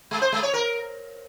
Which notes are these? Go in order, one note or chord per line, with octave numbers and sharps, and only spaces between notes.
G#3
C5
G#3
C#5
A#4